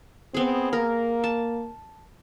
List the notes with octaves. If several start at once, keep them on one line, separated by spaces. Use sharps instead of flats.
B3 C4 G#4
A#3 A#4
A5